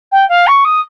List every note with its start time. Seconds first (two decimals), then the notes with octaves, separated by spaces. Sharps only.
0.12 G5
0.29 F5
0.47 C#6
0.65 D#6